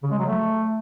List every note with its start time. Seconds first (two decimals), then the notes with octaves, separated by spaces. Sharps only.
0.03 C#3
0.11 G#3
0.19 F#3
0.26 A3